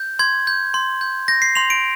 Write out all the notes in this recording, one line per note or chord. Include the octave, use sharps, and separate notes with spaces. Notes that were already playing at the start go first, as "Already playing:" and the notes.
Already playing: G6
C6 G#6
G6
C6
G6
G6 A#6
C7
C6 F7
D7